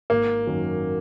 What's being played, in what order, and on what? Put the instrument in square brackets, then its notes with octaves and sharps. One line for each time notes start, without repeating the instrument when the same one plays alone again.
[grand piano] G#1 [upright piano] A#3
[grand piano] F#2 D#3 F#3 C#4